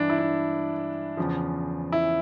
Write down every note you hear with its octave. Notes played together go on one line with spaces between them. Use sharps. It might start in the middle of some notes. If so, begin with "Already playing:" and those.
Already playing: G2 E3 D4
E4
D4
E2 C#3 F3
E4